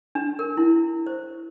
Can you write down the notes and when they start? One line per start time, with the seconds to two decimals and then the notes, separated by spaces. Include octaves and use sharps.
0.15 D4
0.39 A#4
0.57 E4
1.06 C5